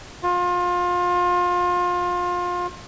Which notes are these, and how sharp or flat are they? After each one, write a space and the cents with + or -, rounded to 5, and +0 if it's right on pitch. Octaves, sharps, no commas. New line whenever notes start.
F4 +25